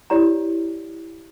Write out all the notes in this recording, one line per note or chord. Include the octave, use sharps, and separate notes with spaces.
E4 G4 C#5 D5 A#5